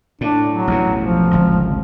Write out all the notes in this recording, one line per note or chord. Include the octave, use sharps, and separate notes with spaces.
A2 D4
F#3
A1 E2 B2
F3
D1 G#1 C#2